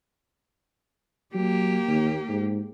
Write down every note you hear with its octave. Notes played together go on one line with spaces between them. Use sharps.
F#3 A#3 G4
D#2
G#2